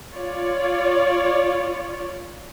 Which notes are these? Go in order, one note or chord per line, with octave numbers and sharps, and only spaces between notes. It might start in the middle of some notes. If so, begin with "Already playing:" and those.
F4 C#5 D5